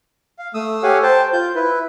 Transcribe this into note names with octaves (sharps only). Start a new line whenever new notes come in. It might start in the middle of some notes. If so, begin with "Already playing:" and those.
F5
A3 D#6 E6
G4 A4 C#5 F5 F#5 G#5
C5 G5 A5
F4 G6
E4 B4